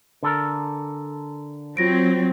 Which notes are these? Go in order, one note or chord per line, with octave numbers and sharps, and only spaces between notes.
D3 A4 A#4
F#3 C4 F4 A#6 D7